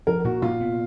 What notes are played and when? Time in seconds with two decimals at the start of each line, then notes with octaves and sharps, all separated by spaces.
0.07 F3 A#4
0.24 A#2 F#4
0.42 A#2 F4
0.60 B3